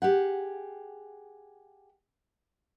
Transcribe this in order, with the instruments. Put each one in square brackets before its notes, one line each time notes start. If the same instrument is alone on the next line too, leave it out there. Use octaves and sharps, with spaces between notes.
[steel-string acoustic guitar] G4 G#4 F#5